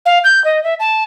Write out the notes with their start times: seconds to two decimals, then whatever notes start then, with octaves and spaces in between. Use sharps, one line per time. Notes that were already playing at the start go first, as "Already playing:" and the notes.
0.05 F5
0.24 G6
0.44 D#5
0.63 E5
0.79 A5